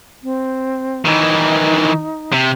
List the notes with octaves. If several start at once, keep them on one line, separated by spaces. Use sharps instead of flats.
C4
D#3 E3 D#4
C3